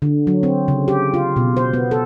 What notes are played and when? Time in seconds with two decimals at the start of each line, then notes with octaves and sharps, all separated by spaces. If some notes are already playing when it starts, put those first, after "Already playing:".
0.02 D3
0.27 F#3
0.43 C4
0.68 C#3
0.88 G4
1.14 F4
1.36 B2
1.57 C5
1.73 B3
1.91 A4